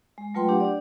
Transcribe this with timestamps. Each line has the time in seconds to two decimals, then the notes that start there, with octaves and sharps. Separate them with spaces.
0.18 G#3
0.34 F#3 A3 F4 B4 G5 C6
0.49 D4 G4 F#5
0.60 D4 D5